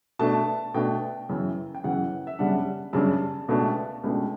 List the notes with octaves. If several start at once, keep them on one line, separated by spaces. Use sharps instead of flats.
B2 A3 D4 A5
B2 A3 D4 G5
F#2 C#3 E3
G5
F#2 C#3 E3 F#5
E5
F#2 C#3 G3 D4 F#5
F#2 C#3 G3 D4 A5
C#2 B2 A3 D4
C#2 B2 A3 D4